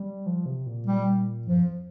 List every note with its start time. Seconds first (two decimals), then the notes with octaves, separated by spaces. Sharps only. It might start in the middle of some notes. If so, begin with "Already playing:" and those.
Already playing: G3
0.26 F3
0.46 C3
0.66 A#2
0.86 G3
1.46 G2 F3
1.58 F2